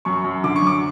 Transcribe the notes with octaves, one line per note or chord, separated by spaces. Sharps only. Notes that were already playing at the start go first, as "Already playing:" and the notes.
F#2 C#6
F#2
D3 D6
C#6
F#2 D6